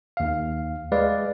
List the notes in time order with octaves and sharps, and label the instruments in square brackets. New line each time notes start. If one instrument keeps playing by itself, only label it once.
[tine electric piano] D#2 F5
G#3 B4 D5 F5